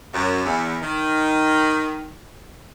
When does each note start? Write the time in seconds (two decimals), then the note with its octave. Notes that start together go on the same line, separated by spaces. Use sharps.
0.13 F#2
0.45 E2
0.82 D#3